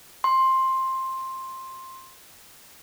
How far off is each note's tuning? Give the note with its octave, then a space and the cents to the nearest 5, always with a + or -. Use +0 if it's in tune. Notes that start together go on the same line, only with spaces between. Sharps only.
C6 +10